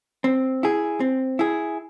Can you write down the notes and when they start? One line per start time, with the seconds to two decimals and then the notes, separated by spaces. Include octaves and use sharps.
0.24 C4
0.63 E4 G#4
1.00 C4
1.39 E4 G#4